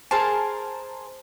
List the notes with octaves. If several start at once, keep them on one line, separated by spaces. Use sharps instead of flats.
G#4 A#4 C5 A5